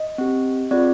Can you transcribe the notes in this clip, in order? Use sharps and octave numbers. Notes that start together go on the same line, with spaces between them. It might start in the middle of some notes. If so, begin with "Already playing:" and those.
Already playing: D#5
C4 G4
C4 F4 G#4 D5